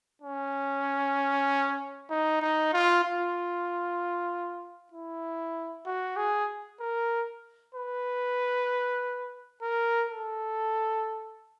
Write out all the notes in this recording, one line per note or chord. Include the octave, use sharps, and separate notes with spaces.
C#4
D#4
D#4
F4
F4
E4
F#4
G#4
A#4
B4
A#4
A4